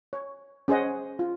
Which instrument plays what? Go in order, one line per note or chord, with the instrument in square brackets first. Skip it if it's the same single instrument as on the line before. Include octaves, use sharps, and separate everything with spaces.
[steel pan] C#5
C#4 G#4 C5 D#5 F#5
F4